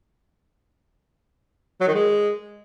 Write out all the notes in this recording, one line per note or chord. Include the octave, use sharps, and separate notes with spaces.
F#3
D#3
G#3